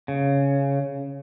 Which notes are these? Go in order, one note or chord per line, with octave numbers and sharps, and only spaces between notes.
C#3